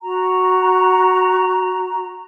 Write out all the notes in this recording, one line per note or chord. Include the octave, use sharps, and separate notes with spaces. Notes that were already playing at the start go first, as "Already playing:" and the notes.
F#4 A#5